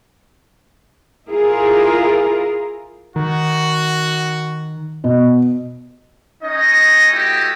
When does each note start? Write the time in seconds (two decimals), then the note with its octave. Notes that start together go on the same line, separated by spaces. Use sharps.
1.29 E4 F4 G#4 A#4
3.16 D#3 F#4
5.04 B2
6.43 C#4 D#4 D#5
7.12 A3 E4 F#4 G4 D#5